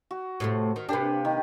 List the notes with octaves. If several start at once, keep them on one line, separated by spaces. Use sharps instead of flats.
F#4
A2 C3 A3
D#3
C3 A#3 D4 G4 B4
D#3